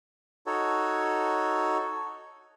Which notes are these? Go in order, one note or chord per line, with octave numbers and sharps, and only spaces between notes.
D#4 F#4 A4 C#5